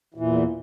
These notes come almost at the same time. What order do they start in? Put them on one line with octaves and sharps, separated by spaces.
E3 A#2 E2